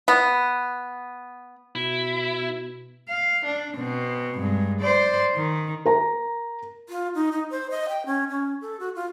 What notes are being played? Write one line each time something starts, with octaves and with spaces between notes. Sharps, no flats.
B3
B2 E4
F5
D4
B2 C4
G2 G#3
C5 D5
D#3
A#4 A#5
F4
D#4
D#4
C5
D#5
G5
C#4
C#4
A4
F#4
F4